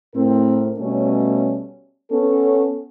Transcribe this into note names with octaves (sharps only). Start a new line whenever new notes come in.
A2 C4 A#4
B2 G3 A3 C#4
B3 C#4 A4